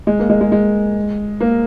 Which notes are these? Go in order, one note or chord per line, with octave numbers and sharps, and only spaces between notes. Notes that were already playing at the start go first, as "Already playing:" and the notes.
G#3
A#3
G#3
G#3
G#3
A#3